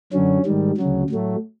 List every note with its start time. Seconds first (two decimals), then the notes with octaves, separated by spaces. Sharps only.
0.13 F#2 D3 F#3 C#4
0.46 G#2 D#3 G3
0.78 D2 C#3 F#3
1.10 A2 F#3 A3